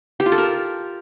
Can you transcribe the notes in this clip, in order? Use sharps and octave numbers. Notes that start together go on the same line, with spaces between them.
G4
F4
A4
A#4